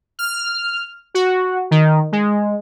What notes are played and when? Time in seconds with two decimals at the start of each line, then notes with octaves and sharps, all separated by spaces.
0.19 F6
1.14 F#4
1.71 D#3
2.12 G#3